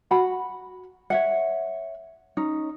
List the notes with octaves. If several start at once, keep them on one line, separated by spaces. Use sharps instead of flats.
F#4 F#5 B5
C#5 E5 F#5
C#4 D#4